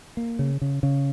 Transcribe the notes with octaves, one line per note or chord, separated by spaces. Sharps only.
A#3
C#3
C#3
C#3